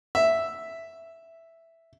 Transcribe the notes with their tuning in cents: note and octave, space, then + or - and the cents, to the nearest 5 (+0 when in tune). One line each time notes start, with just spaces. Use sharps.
E5 +0